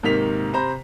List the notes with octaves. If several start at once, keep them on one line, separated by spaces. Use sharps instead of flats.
G#2 C3 D#3 A#3 B6 F7
C3 C5 A#5 B5